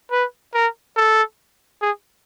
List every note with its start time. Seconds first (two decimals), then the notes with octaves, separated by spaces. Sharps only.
0.11 B4
0.54 A#4
0.97 A4
1.82 G#4